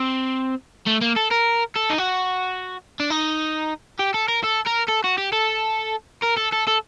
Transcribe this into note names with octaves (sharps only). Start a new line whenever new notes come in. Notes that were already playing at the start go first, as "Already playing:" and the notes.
Already playing: C4
A3
A#3
A4
A#4
A4
D#4
F#4
D4
D#4
G4
A4
A#4
A4
A#4
A4
F#4
G4
A4
A#4
A4
A4
A4